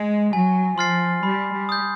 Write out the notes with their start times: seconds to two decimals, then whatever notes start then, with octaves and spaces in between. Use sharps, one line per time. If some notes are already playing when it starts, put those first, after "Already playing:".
Already playing: G#3
0.33 F#3 G#5
0.78 F3 C6 F6 A6 C7
1.23 G3 B5
1.53 G3
1.69 D#6 G6